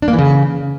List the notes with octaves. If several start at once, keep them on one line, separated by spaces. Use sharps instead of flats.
D4
A#3
E3
C#3